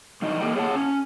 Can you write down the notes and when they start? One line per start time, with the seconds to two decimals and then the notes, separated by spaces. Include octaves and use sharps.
0.22 A2 E3 D4 D#4 D#5
0.41 A#3 G4 A4 D#5 G5
0.56 G#4 C#5 D#5 F#5 A5
0.76 C#4